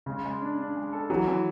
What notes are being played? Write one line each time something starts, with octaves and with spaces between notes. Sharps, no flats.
C#3 G#3
G#3
D4
D4
G#3
A4
E3 F#3
E3